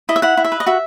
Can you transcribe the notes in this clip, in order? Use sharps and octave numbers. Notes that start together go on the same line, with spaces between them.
E4 D#5
E5
E4 F#5
E4
E5
B4
D#5
F#4 E5